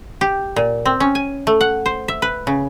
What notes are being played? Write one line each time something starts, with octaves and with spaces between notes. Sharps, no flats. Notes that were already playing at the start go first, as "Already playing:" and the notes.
G4
A#2
C4
C#4
G#5
A3
F#5
C5
E5
B4
C#3